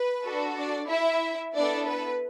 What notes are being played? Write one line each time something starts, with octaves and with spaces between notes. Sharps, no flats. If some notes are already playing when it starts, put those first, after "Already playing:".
Already playing: B4
D4 F#4 A4
D4 D5
E4 E5
B3 D4 E4 A4 D5
B4